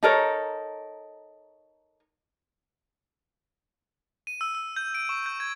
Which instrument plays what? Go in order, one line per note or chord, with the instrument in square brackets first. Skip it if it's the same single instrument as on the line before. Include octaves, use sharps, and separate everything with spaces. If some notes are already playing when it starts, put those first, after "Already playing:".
[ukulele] D#4 A4 A#4 C#5
[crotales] D#7
E6
E6
G6
D7
C#6
G6
G#6